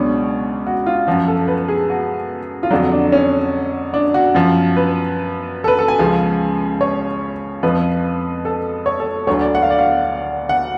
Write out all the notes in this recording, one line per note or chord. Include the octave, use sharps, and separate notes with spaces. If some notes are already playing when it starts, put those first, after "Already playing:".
Already playing: C#2 B2 F#3 C#4 D4
F#4
F4
F#2 F3 F#4
A4
B4
G#4
F#4
F4
F2 D3 F#3 D4
D4
C#4
D4
F#4
F#2 F3
B4
A4
B4
A4
G#5
C#2 C#3 F3
C#5
F2 F3 B4
A4
C#5
A4
D2 D3 F#3 C#5
D5
F#5
F5
D5
F5
F#5